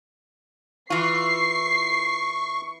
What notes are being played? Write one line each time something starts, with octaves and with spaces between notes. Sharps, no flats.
E3 F4 C#6 C7